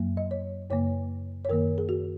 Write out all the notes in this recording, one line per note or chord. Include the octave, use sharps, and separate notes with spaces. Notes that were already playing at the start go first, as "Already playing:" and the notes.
Already playing: F#2 F#3 A#3
D#5
C#5
F#2 C#3 A#3 C#5
C#5
F#2 D#3 A#3 A#4
G#4
F#4